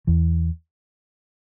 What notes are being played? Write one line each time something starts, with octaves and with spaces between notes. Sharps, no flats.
E2 E3